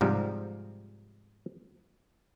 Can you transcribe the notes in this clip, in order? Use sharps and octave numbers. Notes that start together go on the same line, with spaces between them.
G#2 C3 F3 G3